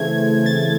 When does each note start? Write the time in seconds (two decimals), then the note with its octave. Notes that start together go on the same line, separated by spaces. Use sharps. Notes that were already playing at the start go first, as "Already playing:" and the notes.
Already playing: C#3 E3 A3 C4 G#6
0.46 A6